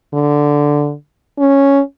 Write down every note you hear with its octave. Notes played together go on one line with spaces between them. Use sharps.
D3
C#4